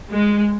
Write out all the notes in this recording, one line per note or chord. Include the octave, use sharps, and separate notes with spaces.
G#3